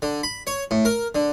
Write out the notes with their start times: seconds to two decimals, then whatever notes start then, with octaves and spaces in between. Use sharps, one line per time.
0.02 D3
0.23 B5
0.47 C#5
0.71 A2
0.85 A#4
1.15 D3